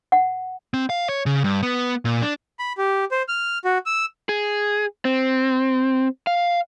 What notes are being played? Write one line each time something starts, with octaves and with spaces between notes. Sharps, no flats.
F#5
C4
F5
C#5
C#3
G2
B3
A#2
D4
B5
G4
C5
F6
F#4
E6
G#4
C4
F5